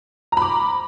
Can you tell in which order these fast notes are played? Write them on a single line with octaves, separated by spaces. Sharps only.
A#5 B5 D6